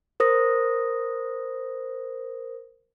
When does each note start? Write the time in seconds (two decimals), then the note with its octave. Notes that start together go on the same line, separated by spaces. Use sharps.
0.20 A#4 C5 D#6 A#6